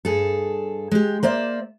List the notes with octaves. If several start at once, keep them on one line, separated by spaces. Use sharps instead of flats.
G2 G#4 A4
G#3 G4
A#3 C5 D5 E5